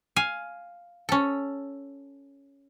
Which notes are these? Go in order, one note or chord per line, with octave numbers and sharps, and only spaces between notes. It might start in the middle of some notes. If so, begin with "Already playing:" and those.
F5 G#5
C#4 A4